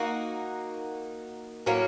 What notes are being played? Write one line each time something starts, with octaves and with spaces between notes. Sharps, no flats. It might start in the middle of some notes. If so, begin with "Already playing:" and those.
Already playing: A#3 D#4 F#4
A2 F#3 A#3 C#4